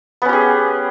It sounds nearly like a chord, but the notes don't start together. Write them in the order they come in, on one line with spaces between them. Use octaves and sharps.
B3 C#4 G4 G#4